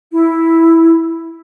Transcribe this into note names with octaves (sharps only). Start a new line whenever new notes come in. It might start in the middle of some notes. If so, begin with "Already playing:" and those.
E4